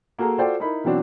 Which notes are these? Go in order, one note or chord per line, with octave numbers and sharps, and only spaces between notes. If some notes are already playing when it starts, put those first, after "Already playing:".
A#3 F#4 G#4 A4 A#5
F4 F#4 A4 C5 D5 G5
D#4 E4 A#4 B5
B2 E3 F#3 C4 D4 F#4